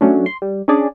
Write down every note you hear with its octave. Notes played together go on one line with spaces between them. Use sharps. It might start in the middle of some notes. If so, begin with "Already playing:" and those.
F#3 A3 C#4 D4
C6
G3
C#4 D4 G#4 D5